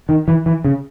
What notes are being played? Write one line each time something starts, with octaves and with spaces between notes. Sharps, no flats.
D#3
E3
E3
C#3